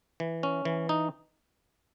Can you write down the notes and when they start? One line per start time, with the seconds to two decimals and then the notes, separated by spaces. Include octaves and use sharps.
0.20 E3
0.43 C#4
0.65 E3
0.89 D#4